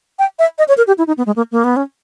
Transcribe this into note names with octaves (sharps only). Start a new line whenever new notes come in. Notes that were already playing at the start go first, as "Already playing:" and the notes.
G5
E5
D#5
C#5
A#4
G4
E4
D#4
B3
G#3
A#3
A#3
B3
C#4